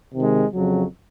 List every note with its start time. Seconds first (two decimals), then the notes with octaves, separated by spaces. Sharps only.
0.15 C3 D#3 G#3
0.54 F2 C#3 F#3